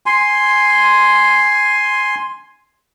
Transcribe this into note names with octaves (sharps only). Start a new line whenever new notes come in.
G#5 C6